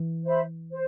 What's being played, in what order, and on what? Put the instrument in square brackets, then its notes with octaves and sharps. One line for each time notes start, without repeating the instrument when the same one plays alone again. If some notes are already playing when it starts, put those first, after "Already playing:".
Already playing: [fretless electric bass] E3
[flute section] C5 E5 B5
C5